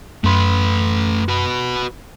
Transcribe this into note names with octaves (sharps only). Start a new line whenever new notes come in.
F#2 A3 B4 C6
F#4 B4